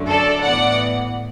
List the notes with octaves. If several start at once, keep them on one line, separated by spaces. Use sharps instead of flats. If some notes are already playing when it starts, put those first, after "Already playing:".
Already playing: F#2 D3 A3
A4 D5
A2 E3 B3 D5 F#5